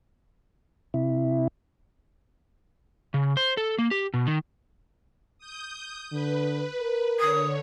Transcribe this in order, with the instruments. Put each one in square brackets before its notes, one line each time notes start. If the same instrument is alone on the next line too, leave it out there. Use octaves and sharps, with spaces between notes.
[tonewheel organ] C3 E4
[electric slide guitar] C#3
C5
A4
A#3
G4
B2
D#3
[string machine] D#6 G6
[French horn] D3 [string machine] B4
[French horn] A#4
[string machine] D3 C#5 [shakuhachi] D#6